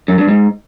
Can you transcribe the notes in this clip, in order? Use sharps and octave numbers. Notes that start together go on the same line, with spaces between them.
F#2
G2
G#2